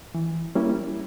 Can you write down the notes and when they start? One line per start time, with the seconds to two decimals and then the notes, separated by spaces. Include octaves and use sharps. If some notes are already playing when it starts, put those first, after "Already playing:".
0.15 E3
0.55 G3 A#3 C#4 E4